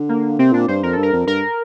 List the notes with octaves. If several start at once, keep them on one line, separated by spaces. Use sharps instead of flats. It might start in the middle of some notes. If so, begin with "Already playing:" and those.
Already playing: D3
A#3
C3 C4
A#2 D4
G2 C5
F2 A#4
G2 A4
A#4
F2
G2 A#4